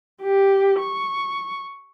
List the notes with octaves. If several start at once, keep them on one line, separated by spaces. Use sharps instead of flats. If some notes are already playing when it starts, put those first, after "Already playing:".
G4
C#6